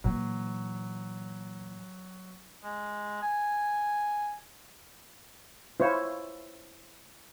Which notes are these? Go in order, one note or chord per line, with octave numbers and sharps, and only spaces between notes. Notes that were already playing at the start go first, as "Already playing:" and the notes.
A#2 E3 F#3
G#3
G#5
E4 F4 C5 C#5